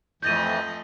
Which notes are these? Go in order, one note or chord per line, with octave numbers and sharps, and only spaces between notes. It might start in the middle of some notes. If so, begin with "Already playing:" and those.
F2 E3 F3 A3 D#5 G6 A6 D#7